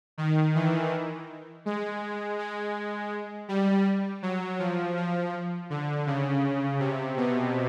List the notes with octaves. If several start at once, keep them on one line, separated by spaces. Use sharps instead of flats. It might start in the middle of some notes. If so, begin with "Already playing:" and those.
D#3
E3
G#3
G#3
G3
F#3
F3
F3
D3
C#3
C3
B2